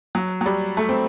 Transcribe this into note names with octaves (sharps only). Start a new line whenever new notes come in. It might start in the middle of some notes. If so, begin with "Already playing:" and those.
F#3
F#3
G3
A3
C4